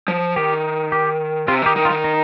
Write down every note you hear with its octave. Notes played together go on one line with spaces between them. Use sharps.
F3
D#3 G4
G4
C3 F4
D#3 G4
D#3
F4
D#3
D#4